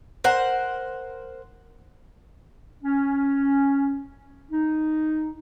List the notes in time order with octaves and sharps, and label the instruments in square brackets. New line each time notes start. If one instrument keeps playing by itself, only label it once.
[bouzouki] A#4 C5 F#5
[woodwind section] C#4
D#4